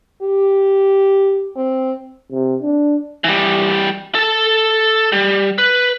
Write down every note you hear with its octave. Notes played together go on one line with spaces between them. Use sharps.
G4
C4
C3
D4
E3 G3
A4 A5
G3
B4